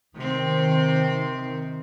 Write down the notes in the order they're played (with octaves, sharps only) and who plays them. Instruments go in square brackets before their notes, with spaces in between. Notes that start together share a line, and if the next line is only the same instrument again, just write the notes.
[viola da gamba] C3 C4 [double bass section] D#3